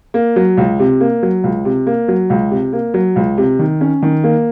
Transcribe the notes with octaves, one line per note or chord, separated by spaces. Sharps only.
A#3
F#3
C#2
C3
A#3
F#3
C#2
C3
A#3
F#3
C#2
C3
A#3
F#3
C#2
C3
D#3
C#4
D#3
A#3